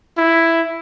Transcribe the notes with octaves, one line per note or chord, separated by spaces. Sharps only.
E4